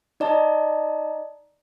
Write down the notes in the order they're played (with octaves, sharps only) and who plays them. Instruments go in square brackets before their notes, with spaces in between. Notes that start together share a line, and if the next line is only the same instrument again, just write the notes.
[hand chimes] D#4 D5 D#5 A5 A#5